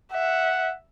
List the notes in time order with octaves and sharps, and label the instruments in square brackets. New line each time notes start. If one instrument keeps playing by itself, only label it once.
[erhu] E5 [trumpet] F#5